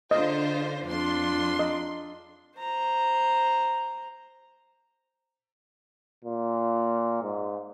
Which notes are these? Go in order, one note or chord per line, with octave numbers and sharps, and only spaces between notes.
D3 F4 C5 D#5
F2 D4 F4 C6
D#5
C5 A#5
A#2
G#2